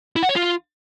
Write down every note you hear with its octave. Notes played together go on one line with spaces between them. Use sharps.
E4
F#5
C#5
F4